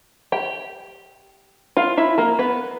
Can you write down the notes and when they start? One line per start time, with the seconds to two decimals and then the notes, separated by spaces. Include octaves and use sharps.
0.32 G4 G5
1.77 F4 F5
1.97 E4 E5
2.18 A#3 A#4
2.39 B3 B4